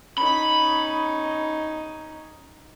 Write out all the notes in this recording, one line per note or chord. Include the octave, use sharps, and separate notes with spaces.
C#4 D#4 B5